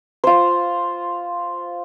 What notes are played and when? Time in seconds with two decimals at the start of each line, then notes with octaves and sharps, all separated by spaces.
0.24 F4 C5